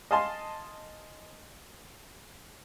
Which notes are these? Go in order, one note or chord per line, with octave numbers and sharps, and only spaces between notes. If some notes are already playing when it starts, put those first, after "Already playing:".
D#5 F5 G#5 A5 C6